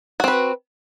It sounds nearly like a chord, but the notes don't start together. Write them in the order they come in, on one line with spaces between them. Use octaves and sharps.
F#4 C4 B4